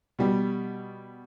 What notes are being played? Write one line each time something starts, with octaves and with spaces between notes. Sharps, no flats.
B2 G3